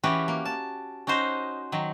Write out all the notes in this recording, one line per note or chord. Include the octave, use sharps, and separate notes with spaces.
E3 C#4 F#4 G4 B4
A#3
A5
C#4 D#4 F#4 C5 D#5
D#3 F#3